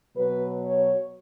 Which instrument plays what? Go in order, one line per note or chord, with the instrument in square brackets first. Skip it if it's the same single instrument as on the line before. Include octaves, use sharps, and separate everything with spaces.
[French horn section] B2 F#3 B4
C#5